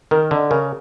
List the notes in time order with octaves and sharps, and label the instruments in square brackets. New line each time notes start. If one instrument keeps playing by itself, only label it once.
[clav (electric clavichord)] D#3 [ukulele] A#4
[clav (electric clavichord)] D3 [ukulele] D#5
[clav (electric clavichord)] C#3 [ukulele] A#4